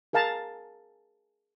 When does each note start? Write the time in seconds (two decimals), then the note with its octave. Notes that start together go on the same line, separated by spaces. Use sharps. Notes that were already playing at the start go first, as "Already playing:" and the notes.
0.13 G#4 A#4 F5 A5 A#5